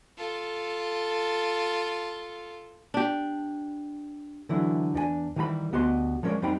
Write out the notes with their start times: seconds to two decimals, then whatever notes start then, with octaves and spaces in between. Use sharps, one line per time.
0.17 F4 A4
2.94 D4 G4
4.49 D3 E3 F#3 E4
4.94 E2 D4 G#4 G#5
5.36 D#3 E3 G3 G#5 B5
5.73 D2 B3 F#4 G4 D#5 C6
6.23 F3 G#3 C#4 A#4 C#5 D5
6.42 F2 G3 C4 D#4 G5 B5